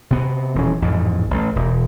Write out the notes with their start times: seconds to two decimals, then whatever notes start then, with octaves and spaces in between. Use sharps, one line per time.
0.11 C3 B3
0.55 D#1 E3 C#4
0.82 A1 F2 G#2
1.30 A1 A3
1.56 E1